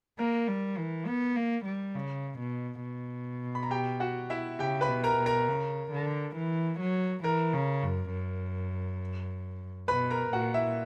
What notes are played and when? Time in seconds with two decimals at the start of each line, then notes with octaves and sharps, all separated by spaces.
0.18 A#3 A#4 A#5
0.47 G3
0.77 E3
1.07 B3
1.36 A#3
1.65 G3
1.95 C#3
2.39 B2
2.83 B2
3.55 B5
3.63 A#5
3.71 G4 G5
4.00 F#4 F#5
4.30 E4 E5
4.59 C#3 G4 G5
4.81 B4 B5
4.89 B2
5.04 A#4 A#5
5.18 B2
5.26 A#4 A#5
5.48 C#3
5.91 D3
6.36 E3
6.80 F#3
7.24 E3 A#4 A#5
7.53 C#3
7.83 F#2
8.12 F#2
9.88 B2 B4 B5
10.10 A#4 A#5
10.33 A#2 F#4 F#5
10.54 E4 E5